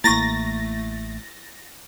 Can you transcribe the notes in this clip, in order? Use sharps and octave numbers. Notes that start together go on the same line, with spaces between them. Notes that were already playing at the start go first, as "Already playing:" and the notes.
A1 A3 A#3 E4 C#6 A6 A#6